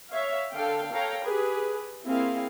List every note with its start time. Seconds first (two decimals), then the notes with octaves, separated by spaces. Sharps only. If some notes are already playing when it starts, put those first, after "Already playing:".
0.11 C#5 E5 F5
0.53 D3 A4 F5 G5
0.92 A4 C#5 F5 G5 A#5
1.22 G4 G#4 B4
2.05 A#3 C4 E4 G#4 F5